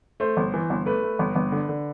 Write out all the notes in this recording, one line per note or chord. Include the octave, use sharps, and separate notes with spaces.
A3 C5
G1
E3
G1
A3 B4
A3
G1
G1
D3
D3